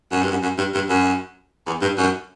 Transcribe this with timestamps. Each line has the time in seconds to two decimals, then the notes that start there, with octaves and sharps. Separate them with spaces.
0.11 F#2
0.22 G2
0.31 F#2
0.42 F#2
0.58 G2
0.74 G2
0.89 F#2
1.66 E2
1.81 G2
1.97 F#2